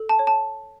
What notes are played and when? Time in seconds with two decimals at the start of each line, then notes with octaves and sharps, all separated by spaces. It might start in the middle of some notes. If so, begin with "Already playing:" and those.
Already playing: A4
0.09 A5
0.19 C#5
0.27 A5